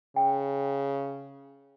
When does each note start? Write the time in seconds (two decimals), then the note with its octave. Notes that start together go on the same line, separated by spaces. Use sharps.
0.16 C#3 G5